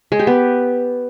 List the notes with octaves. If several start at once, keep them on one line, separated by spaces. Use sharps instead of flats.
G#3
G4
B3